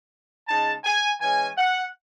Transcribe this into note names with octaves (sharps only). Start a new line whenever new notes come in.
C#3 G#3 D#4 A5
G#5
E3 G#3 C#4 G#5
F#5